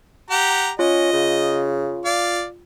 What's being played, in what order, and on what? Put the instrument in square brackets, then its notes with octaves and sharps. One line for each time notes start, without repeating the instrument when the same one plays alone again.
[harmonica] G4 F#5 A#5
[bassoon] C#4 [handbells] F4 [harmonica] D#5
[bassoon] C#3
[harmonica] D5 F5